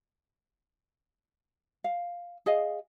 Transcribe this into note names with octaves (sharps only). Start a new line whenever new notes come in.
F5
G#4 D#5 F5